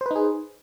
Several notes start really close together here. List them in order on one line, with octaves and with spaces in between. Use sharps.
C5 B4 D#4 G#4